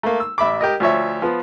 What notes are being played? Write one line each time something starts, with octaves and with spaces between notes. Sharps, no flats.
A3 A#3
E6
A1 E5 B5 D6
G4 A#4 D#5
D2 F3 C#5 E5
F3 B3